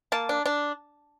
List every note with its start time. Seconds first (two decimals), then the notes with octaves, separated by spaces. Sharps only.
0.12 A#3 A5
0.29 D4
0.46 D4